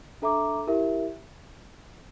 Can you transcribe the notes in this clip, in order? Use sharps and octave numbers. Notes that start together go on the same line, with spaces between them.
D4 A4 E5 A#5 D6
E4 G4 A#4 E5